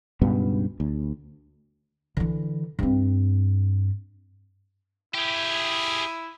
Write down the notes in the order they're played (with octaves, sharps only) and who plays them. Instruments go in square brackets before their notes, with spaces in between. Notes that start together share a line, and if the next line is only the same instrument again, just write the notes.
[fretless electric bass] C#2 G2 B2 B3
D2
[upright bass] D3 E3
G2 C4
[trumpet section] E4 [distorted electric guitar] G4 G#4